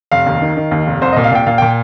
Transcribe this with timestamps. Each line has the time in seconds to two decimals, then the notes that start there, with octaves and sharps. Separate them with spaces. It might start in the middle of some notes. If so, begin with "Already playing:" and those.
0.12 F1 F5
0.26 D#2
0.42 D#3
0.57 D#3
0.71 D#2
0.87 F1
1.01 C2 C5
1.13 A#2 D#5
1.24 F5
1.31 A#2 G5
1.47 A#2 F5
1.58 A#2 G5